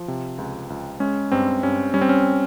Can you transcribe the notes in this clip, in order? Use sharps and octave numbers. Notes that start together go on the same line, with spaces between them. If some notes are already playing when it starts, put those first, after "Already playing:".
Already playing: F3
C3
C#2
C#2
G#3 C#4
G2 C4
G2 C#4
G3 C#4
C4
C#4